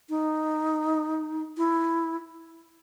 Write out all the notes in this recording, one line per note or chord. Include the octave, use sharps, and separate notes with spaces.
D#4
E4